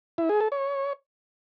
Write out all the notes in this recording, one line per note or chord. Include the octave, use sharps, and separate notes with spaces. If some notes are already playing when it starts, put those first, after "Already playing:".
E4
G#4
A4
C#5